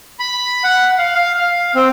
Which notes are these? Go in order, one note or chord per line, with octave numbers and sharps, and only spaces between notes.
B5
F#5
F5
F5
F5
C4